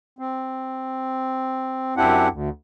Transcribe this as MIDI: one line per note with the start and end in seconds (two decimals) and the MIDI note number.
0.19 1.94 60
1.97 2.28 42
1.97 2.28 60
1.97 2.28 62
1.97 2.28 64
1.97 2.28 67
1.97 2.28 78
2.31 2.49 38